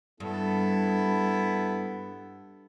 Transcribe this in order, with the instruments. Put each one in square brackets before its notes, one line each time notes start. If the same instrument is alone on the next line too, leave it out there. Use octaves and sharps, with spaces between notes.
[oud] G2 [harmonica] B3 E4 A4